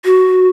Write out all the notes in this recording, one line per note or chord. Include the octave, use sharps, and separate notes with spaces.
F#4